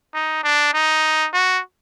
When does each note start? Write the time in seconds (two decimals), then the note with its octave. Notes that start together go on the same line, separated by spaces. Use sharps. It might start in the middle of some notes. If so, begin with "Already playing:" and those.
0.14 D#4
0.44 D4
0.74 D#4
1.33 F#4